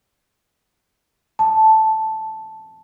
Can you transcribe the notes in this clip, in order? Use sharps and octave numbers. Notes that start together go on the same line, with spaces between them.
A5